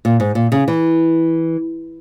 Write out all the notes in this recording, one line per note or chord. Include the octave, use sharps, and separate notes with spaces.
A#2
G#2
A#2
C#3
E3